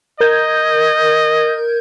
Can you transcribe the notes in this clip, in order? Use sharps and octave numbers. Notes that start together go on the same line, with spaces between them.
A#4 D#5 G6 G#6